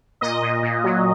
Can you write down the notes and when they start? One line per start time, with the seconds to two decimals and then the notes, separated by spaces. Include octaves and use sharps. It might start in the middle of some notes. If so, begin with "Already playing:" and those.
0.21 A#2 D#5
0.42 A#2
0.63 A#2
0.84 F#3